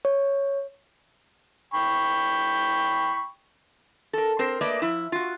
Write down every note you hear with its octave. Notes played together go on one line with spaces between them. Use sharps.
C#5
G5 B5 C#6
A4 A#4
C4 A#4 C5
A3 A#3 B4 D5 D#5
F3 E4
F4 F#4